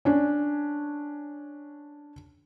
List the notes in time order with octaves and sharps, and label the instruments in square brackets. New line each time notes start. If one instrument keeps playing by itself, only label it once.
[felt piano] C#4 D4